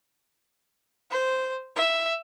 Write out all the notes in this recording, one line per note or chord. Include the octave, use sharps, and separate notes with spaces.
C5
E5